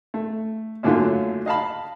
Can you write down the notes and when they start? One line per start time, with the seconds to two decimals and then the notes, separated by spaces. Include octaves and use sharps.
0.14 A3
0.83 F#2 A#2 D3 F#3 A3 F4
1.46 D#5 F5 A5 B5